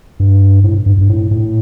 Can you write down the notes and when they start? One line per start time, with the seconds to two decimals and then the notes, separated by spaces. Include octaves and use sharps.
0.20 G2
0.64 A2
0.86 G2
0.98 G2
1.09 A2
1.31 A2